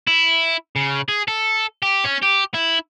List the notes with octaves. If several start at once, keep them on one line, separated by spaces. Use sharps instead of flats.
E4
C#3
G#4
A4
G4
C#4
G4
E4